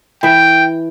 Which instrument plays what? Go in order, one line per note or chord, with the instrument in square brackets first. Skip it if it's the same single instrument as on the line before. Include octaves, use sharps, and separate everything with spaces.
[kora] E3 E5 [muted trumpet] G5